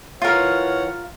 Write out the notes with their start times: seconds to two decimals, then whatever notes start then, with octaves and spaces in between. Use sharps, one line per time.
0.22 E3 F4 A#4 C#5 F#5